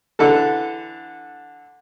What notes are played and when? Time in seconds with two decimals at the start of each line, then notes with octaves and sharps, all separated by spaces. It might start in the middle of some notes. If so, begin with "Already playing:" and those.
0.19 D3 E3 A4